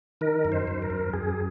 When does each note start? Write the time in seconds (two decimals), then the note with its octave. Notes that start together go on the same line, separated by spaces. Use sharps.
0.21 D#3 A#4
0.45 F#2
0.52 C5
0.67 F#2
0.82 A#4
0.90 F#2
1.13 F#2 G#4